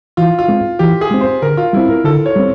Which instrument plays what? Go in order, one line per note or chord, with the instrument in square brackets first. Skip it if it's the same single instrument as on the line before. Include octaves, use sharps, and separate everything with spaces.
[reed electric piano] E3 [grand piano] F4
[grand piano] F4
[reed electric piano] G#3 C4
[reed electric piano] E3 [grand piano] G4
[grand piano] G#4
[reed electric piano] G#3 C4
[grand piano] C5
[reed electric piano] D3 [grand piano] A#4
[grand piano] F4
[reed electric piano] G3 C4 [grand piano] E4
[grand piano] A#4
[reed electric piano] D3 [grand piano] A4
[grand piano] C#5
[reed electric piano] G3 C4